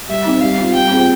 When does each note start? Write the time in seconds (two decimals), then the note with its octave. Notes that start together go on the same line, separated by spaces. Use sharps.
0.08 G3 E5
0.25 C4 D#4
0.41 G3 F5
0.58 C4 F4
0.74 G3 G5
0.90 C4 F4 G#4